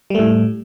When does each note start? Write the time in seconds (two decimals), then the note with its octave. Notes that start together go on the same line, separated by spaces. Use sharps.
0.10 G3
0.15 A3
0.19 A2